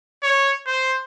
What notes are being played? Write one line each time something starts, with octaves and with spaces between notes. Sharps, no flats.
C#5
C5